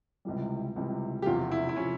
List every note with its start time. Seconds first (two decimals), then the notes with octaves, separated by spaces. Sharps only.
0.25 C#2 C3 E3 G3
0.76 C#2 C3 E3 G3
1.22 G4
1.26 E1 E2 C3 F3 F4
1.51 E4
1.69 E4
1.76 C3 F3 C#4